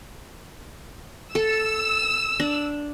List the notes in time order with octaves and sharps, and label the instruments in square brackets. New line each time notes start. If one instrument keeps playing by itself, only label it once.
[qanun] A4 [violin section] E6
[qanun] D4